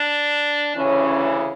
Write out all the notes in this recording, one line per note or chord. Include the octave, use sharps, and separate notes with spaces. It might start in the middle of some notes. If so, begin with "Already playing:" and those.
Already playing: D4
D2 C#3 E3 C#4